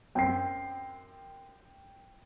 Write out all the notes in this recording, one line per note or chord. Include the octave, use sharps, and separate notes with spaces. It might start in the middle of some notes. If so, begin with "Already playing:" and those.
F#2 C4 G5 C7